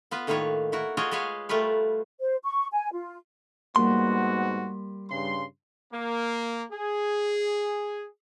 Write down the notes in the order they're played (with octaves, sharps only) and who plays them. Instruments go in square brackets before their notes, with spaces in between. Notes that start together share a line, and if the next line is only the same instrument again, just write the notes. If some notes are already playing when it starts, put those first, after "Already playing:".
[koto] B3 F4 B4
A2 D#3 A#3 F4 B4 C#5
E4 F#4 A#4
F4 F#4 G#4 A#4 C#5 D#5
G#3 G#4 B4 C#5 F5
G3 A3 F4 A#4 B4 C#5
[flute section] C5
C#6
G#5
F4
[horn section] G#2 B3 F#4 [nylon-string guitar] G3 A#3 [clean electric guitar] C6
[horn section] G2 C#3 C6
A#3
G#4